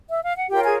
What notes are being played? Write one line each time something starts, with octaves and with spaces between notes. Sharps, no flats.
E5
F5
F#5
F4 G4 A#4 C#5 G5
G#4 G#5